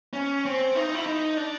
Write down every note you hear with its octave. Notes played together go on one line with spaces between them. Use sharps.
C#4
C4
D#4
E4
D#4
D4